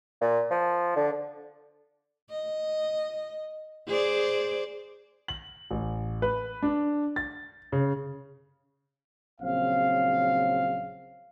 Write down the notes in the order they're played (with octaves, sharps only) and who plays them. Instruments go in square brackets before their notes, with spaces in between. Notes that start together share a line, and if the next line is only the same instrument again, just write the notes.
[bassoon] A#2
F3
D3
[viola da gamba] D#5
G#4 C5 D5
[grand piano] F#7
A1
B4
D4
A6
C#3
[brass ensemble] A#1 C#3 F#3 C4 F5